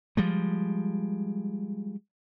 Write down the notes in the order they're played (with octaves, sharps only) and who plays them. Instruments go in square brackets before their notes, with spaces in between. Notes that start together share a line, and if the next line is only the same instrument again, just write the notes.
[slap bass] F3 G3 G#3